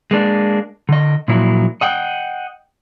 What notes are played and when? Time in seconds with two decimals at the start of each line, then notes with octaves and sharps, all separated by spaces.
0.11 G#3 A#3 D4
0.89 D3 D#5
1.28 A#2 F3 F#3 A#3 E4
1.81 D#5 F#5 G5